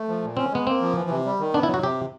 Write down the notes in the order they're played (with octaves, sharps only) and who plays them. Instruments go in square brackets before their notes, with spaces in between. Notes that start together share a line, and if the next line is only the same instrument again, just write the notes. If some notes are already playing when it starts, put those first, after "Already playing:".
Already playing: [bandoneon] A3
F3
A#2
[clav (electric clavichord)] C4 [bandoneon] C#4
[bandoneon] G#3 [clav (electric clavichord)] B3
[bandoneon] A#3 [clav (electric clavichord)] C4
[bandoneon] F3
E3
C3
G3
D#3
[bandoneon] B3 [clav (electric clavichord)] D4
[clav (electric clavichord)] E4
[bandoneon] F#3
[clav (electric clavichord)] F#4
[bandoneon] C3 [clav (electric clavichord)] G4